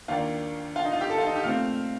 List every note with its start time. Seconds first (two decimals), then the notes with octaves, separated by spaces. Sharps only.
0.08 D#2 D#3 A#3 D4 F4
0.76 F4
0.85 D#4
0.93 F4
1.01 G4
1.10 A4
1.18 F4
1.27 D#4
1.36 G4
1.44 A#2 A3 C4 F5